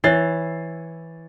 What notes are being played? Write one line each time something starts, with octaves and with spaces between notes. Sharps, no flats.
E3 C#5 A6 C7